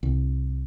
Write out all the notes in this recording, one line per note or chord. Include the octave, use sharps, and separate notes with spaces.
C2